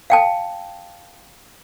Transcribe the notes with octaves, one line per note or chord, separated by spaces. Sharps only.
F5 G5 A5